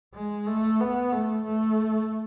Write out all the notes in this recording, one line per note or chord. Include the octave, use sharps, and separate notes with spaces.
G#3
A3
B3
A3
A3